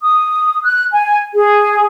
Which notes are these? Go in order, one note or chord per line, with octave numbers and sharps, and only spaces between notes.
D#6
F#6
G#5
G#4